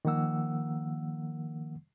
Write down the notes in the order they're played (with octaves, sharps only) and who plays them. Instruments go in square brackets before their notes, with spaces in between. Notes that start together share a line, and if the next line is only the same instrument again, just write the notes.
[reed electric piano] D#3 F3 A#3 F#5 E6